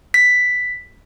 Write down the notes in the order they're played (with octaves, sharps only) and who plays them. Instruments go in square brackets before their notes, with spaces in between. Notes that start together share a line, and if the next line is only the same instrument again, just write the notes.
[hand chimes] B6